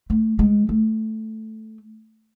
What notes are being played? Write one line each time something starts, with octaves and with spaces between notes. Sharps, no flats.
A3
G#3
A3